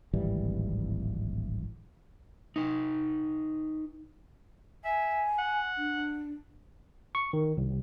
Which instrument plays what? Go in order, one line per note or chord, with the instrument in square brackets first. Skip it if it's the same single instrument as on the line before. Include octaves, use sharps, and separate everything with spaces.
[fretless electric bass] D1 G#1 E3 G3
[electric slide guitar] D#4 B4
[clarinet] E5 [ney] G#5
[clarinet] F#5
[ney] D4
[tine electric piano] C#6
D#3
C2